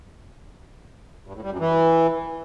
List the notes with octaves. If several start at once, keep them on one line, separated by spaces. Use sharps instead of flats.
G2
A2
G3
F#2
E3